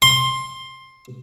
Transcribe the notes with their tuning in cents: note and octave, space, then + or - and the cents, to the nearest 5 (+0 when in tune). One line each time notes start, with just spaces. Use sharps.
C6 +15